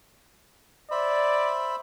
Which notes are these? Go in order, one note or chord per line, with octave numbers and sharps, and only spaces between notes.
C5 D5 E5 B5